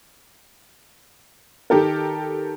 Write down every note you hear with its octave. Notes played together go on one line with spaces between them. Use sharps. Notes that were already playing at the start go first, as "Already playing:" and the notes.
D#3 G4 A4 A#4